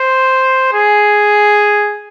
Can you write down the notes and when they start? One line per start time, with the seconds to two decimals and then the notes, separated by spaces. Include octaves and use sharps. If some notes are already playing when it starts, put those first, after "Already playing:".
Already playing: C5
0.73 G#4